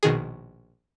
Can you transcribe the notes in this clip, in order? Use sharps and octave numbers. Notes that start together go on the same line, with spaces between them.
A#1 B2 D#3 G#4